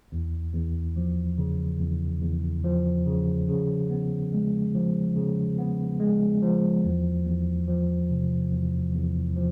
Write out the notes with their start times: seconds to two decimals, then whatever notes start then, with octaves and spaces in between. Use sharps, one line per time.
0.12 E2
0.54 E2
0.96 F3
1.38 C#3
1.80 E2
2.22 E2
2.64 F3
3.06 C#3
3.48 C#3
3.90 B3
4.33 G#3
4.74 F3
5.16 C#3
5.59 B3
6.00 G#3
6.42 F3
6.84 E2
7.26 E2
7.68 F3
8.10 C3
8.52 E2
8.95 E2
9.36 F3